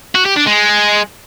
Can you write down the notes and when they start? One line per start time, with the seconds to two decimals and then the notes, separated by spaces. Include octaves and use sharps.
0.15 F#4
0.26 G4
0.37 D4
0.47 G#3